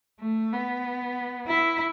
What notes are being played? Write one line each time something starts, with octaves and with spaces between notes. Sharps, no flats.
A3
B3
E4